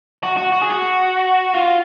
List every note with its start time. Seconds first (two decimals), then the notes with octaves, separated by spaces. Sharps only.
0.23 F#4
0.37 F#4
0.52 F#4
0.61 G#4
0.70 F#4
1.54 F4